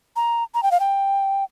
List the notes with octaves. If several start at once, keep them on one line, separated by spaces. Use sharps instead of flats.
A#5
A#5
G5
F5
G5